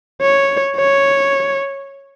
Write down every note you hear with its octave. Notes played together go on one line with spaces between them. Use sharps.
C#5
C#5